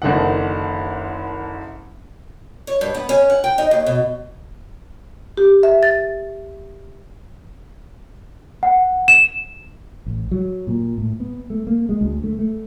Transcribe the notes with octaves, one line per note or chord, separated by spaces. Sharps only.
F#1 D3 D#3 F#5
C#5
G2
B3
C#4
F#5
G5
D#4
D#2
B2
G4
E5
A6
F#5
E7
A1
F#3
A#2
A2
B3
A3
A#3
G#3
D2
A3
A3